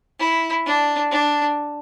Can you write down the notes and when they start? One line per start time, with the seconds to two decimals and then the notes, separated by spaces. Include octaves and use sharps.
0.19 E4
0.66 D4
1.11 D4